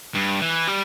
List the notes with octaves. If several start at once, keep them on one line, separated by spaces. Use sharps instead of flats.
G2
E3
G3